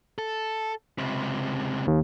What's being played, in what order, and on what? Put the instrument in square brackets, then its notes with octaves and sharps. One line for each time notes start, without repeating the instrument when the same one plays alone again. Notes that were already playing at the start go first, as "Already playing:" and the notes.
[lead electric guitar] A4
C#2 C3
[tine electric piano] D#2